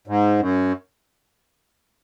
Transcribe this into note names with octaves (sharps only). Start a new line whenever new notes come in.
G#2
F#2